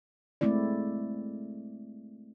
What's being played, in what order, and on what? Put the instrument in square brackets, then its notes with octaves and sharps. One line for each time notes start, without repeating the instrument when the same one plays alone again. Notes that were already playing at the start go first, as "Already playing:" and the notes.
[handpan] G#3 A3 C4 E4 D5